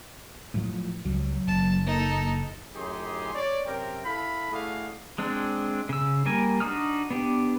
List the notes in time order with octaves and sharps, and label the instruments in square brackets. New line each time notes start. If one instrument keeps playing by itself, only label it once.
[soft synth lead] A2 [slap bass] F3 F#3 A3
[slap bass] C#2 G3 [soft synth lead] F#3
[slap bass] F#1 [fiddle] A5
[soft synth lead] A#3 [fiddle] D#4 A4
[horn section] F#2 A2 D#4 G4 G#4 C6
C#5 D5
F#2 C3 C4 A#4 G5
E4 A4 F5 B5
A3 E4 F#4 G#4 D5 F5
[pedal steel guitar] G#3 C4 D4
C#3 E6
G3 A#3 A#4 G#5
D4 D#4 F#4 D#6 F6
B3 D4 G4